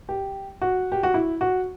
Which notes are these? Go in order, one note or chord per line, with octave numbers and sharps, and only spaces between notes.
G4
F#4
G4
F#4
E4
F#4